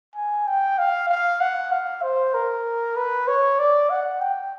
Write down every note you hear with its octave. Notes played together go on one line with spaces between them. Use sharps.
G#5
G5
F5
F5
F#5
F5
C5
A#4
B4
C#5
D5
F#5
G5